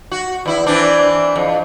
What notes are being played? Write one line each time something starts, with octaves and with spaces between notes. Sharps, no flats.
F#4
E2 E4
E3 C4 D4
F2